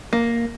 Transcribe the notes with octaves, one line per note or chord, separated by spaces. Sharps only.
A#3